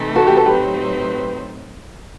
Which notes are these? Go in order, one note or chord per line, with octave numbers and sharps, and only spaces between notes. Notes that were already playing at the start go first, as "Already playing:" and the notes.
Already playing: C3 E3 A3 D#4
F#4 A4
G4
A4
A2 F#3 C4 D#4 G4 B4